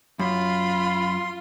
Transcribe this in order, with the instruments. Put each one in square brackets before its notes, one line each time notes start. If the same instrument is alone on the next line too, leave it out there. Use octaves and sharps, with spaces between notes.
[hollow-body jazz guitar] F#2 [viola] F4 [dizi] B5 [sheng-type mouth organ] C6